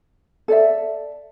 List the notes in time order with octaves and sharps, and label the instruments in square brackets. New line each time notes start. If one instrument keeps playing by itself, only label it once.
[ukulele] A4 D5 E5